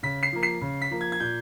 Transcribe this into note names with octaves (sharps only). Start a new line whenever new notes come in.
C#3 B6
C7
F3 A#3
C7
C#3
B6
F3 A#3
G#6
G#6
A#2 G6